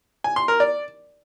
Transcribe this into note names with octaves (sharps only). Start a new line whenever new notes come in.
G#5
C6
A#4
D5